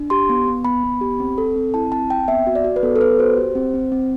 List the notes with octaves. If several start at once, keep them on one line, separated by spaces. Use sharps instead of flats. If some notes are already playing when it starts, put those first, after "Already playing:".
Already playing: D4
G4 C6
B3
B3
B3 B5
B3
G4
C4
A4
C4
E4 A5
C4 A5
C4 G5
B3 E5
F#4
D5
F#4
B4
B3 A4
A4
B3 B4
F#4 C5
G4
C4
C4
C4